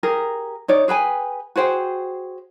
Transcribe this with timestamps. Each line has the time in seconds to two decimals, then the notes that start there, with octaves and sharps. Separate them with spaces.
0.03 G4 G#4 A#4
0.68 D#4 C#5 D5
0.88 G#4 B4 G5 G#5
1.56 F#4 G#4 C5 G5